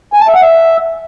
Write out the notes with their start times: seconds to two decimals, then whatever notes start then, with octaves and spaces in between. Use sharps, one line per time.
0.13 G#5
0.20 A5
0.28 E5
0.35 F#5
0.42 E5